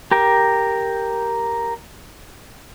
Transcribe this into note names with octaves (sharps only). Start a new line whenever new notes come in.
G4 A#4 G5